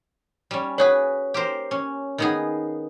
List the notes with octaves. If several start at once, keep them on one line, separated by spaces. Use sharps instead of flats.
G3 C#4
F#4 G#4 B4 C#5
G4 A#4 C5
C#4
D#3 B3 G#4